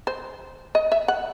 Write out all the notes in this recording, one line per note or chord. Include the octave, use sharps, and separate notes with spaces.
C5
D#5
E5
F#5